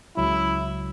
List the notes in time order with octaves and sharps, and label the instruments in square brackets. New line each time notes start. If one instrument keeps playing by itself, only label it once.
[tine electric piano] C#2 C#3 F#3 [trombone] E4